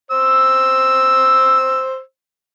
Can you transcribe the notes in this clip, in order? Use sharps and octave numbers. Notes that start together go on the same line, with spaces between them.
C5 E6